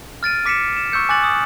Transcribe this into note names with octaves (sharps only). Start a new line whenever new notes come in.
F6 A6 D7 D#7
D6 B6 C#7 D7 E7
E7
C#6 E6 G6 C#7
G#5 D6 F#6 A6 F#7
D#6